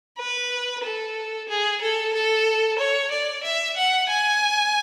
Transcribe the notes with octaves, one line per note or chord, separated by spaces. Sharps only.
B4
A4
G#4
A4
A4
C#5
D5
E5
F#5
G#5